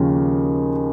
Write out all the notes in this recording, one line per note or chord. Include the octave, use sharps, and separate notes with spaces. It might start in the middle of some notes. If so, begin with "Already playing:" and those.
Already playing: D#2 C#3 F3